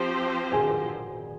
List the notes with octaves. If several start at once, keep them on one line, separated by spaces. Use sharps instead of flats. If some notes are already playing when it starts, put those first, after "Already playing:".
Already playing: F3 C4 G4 C5
G#4 G#5